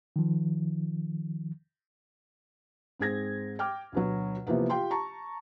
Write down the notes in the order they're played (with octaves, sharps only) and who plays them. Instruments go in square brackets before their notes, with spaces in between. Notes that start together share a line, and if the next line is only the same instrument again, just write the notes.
[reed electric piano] D#3 F3
[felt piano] G#2 C4 G#4 G#6 A#6
G5 D6 F6
D2 B2 F#3
C3 E3 F3 A#3 B3
F4 G4 G5 C6
A5 A#5 C#6